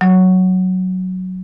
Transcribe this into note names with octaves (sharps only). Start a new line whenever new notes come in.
F#3